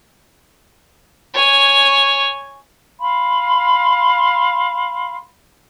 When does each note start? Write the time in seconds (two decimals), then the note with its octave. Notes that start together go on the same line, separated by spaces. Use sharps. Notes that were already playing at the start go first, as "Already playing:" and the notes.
1.34 C#5 G#5
2.99 F5 B5 C6